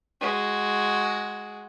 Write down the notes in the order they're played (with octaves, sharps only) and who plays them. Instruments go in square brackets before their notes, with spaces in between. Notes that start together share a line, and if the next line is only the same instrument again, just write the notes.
[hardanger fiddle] G#3 F#4